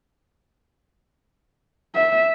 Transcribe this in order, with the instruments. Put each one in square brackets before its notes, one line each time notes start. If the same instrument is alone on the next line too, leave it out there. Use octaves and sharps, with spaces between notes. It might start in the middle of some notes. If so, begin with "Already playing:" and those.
[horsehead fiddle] E5